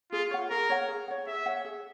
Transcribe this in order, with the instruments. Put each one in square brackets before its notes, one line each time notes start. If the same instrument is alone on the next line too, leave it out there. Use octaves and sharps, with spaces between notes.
[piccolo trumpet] F4 [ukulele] G#4
[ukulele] C#5 F#5
[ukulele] G#4 [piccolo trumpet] A#4
[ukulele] C#5 F#5
G#4
C#5 F#5
[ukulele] G#4 [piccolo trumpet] E5
[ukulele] C#5 F#5
G#4